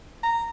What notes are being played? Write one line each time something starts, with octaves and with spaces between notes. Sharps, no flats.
A#5